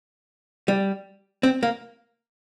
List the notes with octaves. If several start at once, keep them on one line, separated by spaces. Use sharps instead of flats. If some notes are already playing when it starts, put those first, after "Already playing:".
G3
C4
A#3